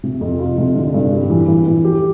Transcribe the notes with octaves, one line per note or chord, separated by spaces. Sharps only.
C3
F2
F4
C3
D3
G2
G3
E3
E3
E3
G4